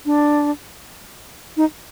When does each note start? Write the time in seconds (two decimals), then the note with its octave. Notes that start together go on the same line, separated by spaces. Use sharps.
0.06 D4
1.57 D#4